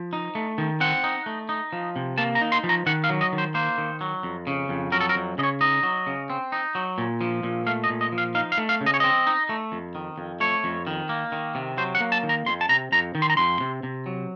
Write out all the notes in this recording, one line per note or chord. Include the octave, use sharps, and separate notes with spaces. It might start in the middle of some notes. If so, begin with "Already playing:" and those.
Already playing: F3
D#4
A3
D#3
C4 F#5
D#4
A3
D#4
F3
C3
A#3 A5
A#5
D#4
C6
F3
A#5
D#3 F#5
F5
F#3
D#5
D#3
C5
A#3 C5
D#3
F#3
F2
C#3
F2
F#3 A#4
A4
A#4
F2
C#3 D#5
C#5
D#4 D#5
F#3
C#3
C4
D#4
F#3
A#2
F3
A#2
A3 F5
D#5
A#2
D#5
F3
F5
D#4 F5
F5
A3
F5
C#3
D#5
C#5
C4 D#5
D#4
A3
F2
D#3
F2
A3 C#5
F2
D#3
A#3
D#3
C3
F#3 C5
F#5
A#3
A5
D#3
A#5
F2 C6
A5
C3 A#5
F2 A#5
D#3
C6
A#5
F2 C6
C3
C3
F#3